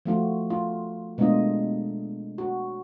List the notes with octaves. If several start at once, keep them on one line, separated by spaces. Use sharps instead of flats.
F3 A3 F4 F#4
F4
B2 G#3 A3 D4 F4 D#5
F#4